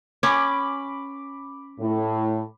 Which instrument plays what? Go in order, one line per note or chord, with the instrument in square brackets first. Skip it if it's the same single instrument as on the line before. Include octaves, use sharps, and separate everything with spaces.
[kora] C#4 [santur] B5 D6
[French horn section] A2